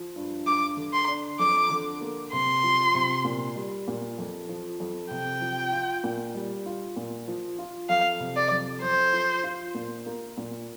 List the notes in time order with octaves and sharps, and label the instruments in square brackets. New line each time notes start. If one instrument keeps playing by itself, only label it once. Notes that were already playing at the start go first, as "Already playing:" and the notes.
Already playing: [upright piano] F3
G2
[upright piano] G2 [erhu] D6
[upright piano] D3
[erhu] C6
[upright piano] D4
[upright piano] F2 [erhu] D6
[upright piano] D3
A#3
[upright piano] C3 [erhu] C6
[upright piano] F3
C3
A#2
G3
A#2
F2
F3
F2
[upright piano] C3 [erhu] G5
[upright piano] F3
F4
A#2
G3
F4
A#2
F3
F4
[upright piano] F2 [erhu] F5
[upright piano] C3
[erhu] D5
[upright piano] F2
[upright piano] F2 [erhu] C5
[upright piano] F3
F4
A#2
A#3
A#2